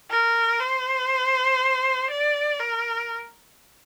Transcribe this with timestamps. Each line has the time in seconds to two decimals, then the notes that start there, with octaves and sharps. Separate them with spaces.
0.10 A#4
0.60 C5
2.10 D5
2.59 A#4